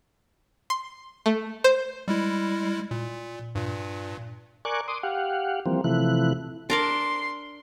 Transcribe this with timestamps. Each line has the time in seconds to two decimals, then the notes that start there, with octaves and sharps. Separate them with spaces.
0.70 C6
1.26 A3
1.64 C5
2.08 G3 G#3 E4
2.91 A#2
3.55 G2 A#2
4.65 A#4 D5 G#5 C#6 D6 F#6
4.88 C6 D6 D#6
5.03 G4 F5 F#5
5.66 E3 F3 G3 A#3 C4
5.84 C3 E3 F3 A3 E4 F#6
6.70 D4 A#4 D5 C6